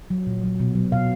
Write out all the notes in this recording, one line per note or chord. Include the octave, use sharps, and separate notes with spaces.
F#3
A#2
F#3
B2
F#3
B2 F5